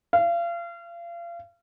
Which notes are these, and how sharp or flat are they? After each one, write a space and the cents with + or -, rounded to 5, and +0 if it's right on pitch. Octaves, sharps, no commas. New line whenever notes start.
F5 -35